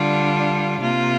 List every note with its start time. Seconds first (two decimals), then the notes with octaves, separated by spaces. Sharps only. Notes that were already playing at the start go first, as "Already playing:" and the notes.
Already playing: D3 G3 D4 F4
0.80 C3 A#3 F4